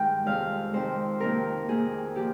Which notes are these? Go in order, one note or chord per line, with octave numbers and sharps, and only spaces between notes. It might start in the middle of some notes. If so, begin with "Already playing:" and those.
Already playing: G2 D#3 G#3 G5
F2 C3 D#3 G#3 F5
F2 C3 D#3 G#3 C5
F2 C3 D#3 A#3 A#4
F2 C3 D#3 A#3 G#4
A#2 F3 G4